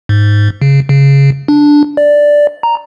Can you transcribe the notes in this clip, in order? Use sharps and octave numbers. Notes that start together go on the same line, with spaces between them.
G#2
C#3
C#3
D4
D5
A#5